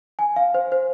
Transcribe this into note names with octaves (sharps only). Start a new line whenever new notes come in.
G#5
F5
C5
C5